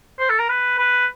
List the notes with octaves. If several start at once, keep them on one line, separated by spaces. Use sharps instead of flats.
C5
A4
A#4
B4
B4